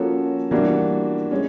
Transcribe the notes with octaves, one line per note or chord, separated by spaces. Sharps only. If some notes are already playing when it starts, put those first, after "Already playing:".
Already playing: F3 A#3 C#4 F#4 A4
E3 G3 A#3 D4 F#4
G#3 C#4